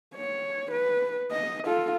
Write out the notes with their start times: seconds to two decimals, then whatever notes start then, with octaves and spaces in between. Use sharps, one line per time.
0.16 C#5
0.71 B4
1.31 D#5
1.66 F4 A4